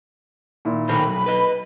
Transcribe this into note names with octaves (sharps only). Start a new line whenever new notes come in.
A#2 D#3 E4
B1 D#3 A#4 C5 B5
F#2
B4 D#5